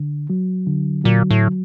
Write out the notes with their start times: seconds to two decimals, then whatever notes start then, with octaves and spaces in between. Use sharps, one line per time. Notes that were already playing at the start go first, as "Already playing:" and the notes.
Already playing: D3
0.30 F#3
0.66 D3
1.04 A#2 F#3
1.30 A2